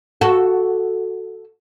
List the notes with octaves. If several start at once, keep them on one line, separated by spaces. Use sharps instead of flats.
F#4 A4